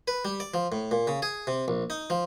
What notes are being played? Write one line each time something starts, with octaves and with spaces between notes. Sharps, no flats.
B4
G3
D5
F3
A2
A#2
C#3
G#4
C3
A#1
D#4
F3